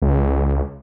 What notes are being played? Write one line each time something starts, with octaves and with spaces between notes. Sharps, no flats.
C#2